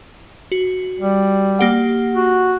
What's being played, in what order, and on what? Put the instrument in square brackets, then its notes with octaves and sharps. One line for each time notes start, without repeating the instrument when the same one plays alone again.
[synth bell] F#4
[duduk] G3
[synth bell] A#3 G4 F#5
[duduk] F#4